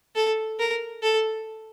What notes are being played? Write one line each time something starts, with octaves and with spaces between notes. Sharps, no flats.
A4
A#4
A4